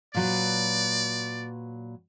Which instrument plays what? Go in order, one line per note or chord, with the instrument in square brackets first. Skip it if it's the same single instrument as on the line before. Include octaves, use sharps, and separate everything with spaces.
[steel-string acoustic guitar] A#2 F#3 B4 [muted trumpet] D5